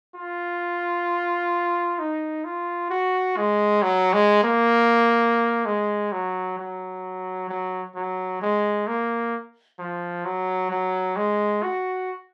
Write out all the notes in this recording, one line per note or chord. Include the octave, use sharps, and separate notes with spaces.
F4
D#4
F4
F#4
G#3
F#3
G#3
A#3
G#3
F#3
F#3
F#3
F#3
G#3
A#3
F3
F#3
F#3
G#3
F#4